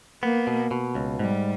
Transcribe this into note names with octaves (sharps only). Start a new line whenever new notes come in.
A#3 B3
B2
B2
C#2
G#2 G3